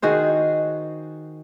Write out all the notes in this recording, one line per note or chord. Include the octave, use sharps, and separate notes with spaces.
D#3 F#4 G#4 C5